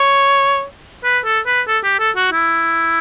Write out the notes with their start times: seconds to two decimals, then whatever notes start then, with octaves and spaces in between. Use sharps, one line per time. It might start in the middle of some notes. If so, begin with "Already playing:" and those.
Already playing: C#5
1.04 B4
1.25 A4
1.47 B4
1.68 A4
1.84 G4
2.00 A4
2.16 F#4
2.32 E4